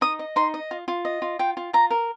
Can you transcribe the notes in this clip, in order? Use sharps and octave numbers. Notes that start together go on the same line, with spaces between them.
D#4 D#6
D#5
D#4 C6
D#5
F4
F4
D#5
F4
F4 G5
F4
F4 A#5
A#4